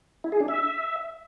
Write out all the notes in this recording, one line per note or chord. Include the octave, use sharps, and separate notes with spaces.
E4
G#4
D4
E5